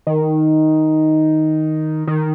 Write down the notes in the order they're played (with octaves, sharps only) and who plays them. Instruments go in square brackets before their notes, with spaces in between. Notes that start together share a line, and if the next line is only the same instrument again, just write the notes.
[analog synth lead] D#3
D#3